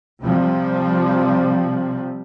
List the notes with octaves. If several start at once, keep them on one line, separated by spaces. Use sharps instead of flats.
C3 F3 G3